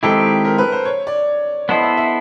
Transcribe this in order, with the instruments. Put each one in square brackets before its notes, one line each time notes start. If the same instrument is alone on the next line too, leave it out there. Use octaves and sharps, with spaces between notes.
[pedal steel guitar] D#3 G#3 C4 E4 G4 [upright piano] A4
[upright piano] A#4
B4
C5
C#5
D5
[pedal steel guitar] B3 E4 A4 C5 [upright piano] D#5
[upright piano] E5
E5